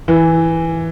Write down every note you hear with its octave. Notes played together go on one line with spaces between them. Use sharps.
E3